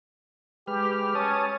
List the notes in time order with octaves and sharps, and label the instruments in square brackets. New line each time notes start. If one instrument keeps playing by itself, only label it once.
[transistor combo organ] G#3 B4 F6 [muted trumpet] G4
[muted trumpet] C#4 [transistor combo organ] C#5 A5 D#6